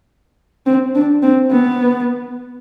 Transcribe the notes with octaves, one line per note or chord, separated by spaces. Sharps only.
C4
D4
C4
B3